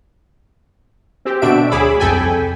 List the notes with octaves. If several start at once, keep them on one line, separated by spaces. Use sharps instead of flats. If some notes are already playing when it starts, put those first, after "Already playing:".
C4 G4
B2 D3 D4 F#4 E5 D7
D2 G#4 C#5 B5 D6 E6
C2 F2 A4 G5 G#5 B5